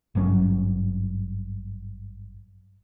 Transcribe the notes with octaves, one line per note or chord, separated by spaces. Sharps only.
G#1 G2 F#3 C#4